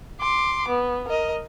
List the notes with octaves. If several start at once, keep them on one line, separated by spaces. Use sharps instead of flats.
C6 D6
B3
A#4 D#5